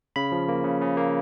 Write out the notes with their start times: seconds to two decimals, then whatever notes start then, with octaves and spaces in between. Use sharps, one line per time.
0.16 C#3 B5
0.32 F3
0.49 A#3
0.64 C#3
0.81 C#3
0.97 A#3